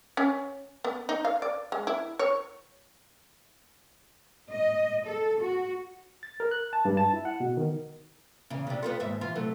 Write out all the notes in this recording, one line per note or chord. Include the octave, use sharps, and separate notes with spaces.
C#4
B3
D#4
F5
D5
G#3
E4
C#5
D#5
A4
F#4
A6
A#4
F#6
A5
G2
A5
E4
F#5
B2
D#3
E2 C#3
C3 D4
B3 F4 A4
D#2 G#2 E5
E3 F4
C3 F#3 A3